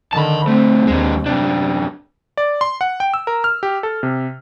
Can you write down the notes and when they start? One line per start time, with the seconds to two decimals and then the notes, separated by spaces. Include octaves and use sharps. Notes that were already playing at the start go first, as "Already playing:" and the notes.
0.13 D3 D#3 A5 B5
0.48 B1 A3 C4
0.87 D#2 G#3 D4
1.26 F#2 C3 D4
2.37 D5
2.61 C6
2.81 F#5
3.00 G5
3.14 E6
3.27 A#4
3.44 F6
3.63 G4
3.83 A4
4.03 C3